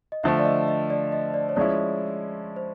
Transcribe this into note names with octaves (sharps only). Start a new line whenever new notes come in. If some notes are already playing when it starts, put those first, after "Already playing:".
D#5
D3 F3 A3 E5
D5
D#5
D#5
D5
D#5
D5
C#5
F3 G#3 C#4 E4 D5
C5